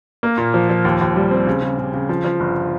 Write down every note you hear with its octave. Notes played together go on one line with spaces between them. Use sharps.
A#3
A#2
F3
F3
D#2
D#2
G3
C4
C#3
C#3
C#3
C#3
F3
F3
G1